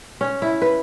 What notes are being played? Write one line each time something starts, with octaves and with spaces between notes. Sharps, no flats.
C#4
E4
B4